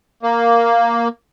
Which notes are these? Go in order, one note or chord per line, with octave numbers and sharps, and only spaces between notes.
A#3